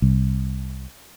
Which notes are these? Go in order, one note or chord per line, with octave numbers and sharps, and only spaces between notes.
C2